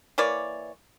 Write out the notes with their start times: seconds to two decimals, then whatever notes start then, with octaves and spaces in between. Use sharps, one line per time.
0.18 E3 A#3 C#5 D5